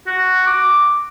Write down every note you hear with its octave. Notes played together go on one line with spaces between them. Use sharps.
F#4
D6